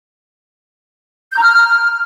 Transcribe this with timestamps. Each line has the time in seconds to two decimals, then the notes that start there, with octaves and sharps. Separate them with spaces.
1.31 G6
1.37 A#5
1.42 F6